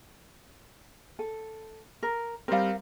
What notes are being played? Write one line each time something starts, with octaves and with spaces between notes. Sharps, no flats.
A4
A#4
G3 C4 A#4 C5 F5